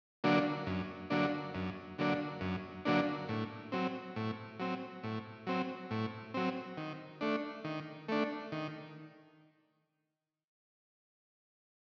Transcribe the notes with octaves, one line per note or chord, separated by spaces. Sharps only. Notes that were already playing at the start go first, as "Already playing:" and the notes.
D3 F#3 A#3 D4
F#2
D3 F#3 A#3 D4
F#2
D3 F#3 A#3 D4
F#2
D3 F#3 A#3 D4
A2
F#3 C4
A2
F#3 C4
A2
F#3 C4
A2
F#3 C4
D#3
A3 D4
D#3
A3 D4
D#3